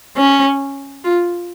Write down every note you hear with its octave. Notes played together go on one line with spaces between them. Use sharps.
C#4
F4